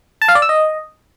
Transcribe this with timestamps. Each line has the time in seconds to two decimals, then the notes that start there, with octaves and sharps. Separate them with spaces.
0.22 A5
0.28 F5
0.35 D5
0.42 E6
0.49 D#5